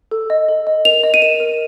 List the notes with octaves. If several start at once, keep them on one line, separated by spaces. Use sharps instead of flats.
A4
D#5
A4
D#5
A#4 F7
D#5
D#7
A#4 E7
A#4